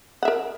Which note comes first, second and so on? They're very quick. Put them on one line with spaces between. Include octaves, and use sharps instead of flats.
F#5 E5 A#4